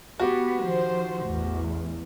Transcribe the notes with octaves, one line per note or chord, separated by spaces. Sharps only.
B3 F#4 G4
D#3 F3 C5
A1 E2